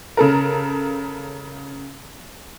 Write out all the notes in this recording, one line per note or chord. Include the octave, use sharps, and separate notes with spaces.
C#3 A4 A#4